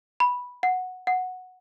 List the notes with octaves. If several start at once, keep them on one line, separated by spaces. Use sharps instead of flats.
B5
F#5
F#5